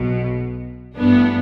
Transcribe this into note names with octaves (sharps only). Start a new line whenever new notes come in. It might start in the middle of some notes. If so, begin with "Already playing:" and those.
Already playing: B1 B2
A1 G2 E3 B3 D4